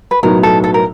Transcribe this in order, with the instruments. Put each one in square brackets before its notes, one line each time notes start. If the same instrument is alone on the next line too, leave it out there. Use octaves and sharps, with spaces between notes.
[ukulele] B4
[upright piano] B1 A2 F#3 B3 D#4 [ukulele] A#4
[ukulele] A4
A4
A#4